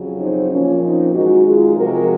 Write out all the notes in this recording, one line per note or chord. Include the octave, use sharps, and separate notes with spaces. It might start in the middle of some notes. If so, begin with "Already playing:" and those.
Already playing: F2 C#3 F#3
C4 D#4
A#2 F3 A#3 C#4
C4 D#4
F#2 D#3 G#3 D#4 F#4
F4 G#4
C3 F3 G#3 F#4 A#4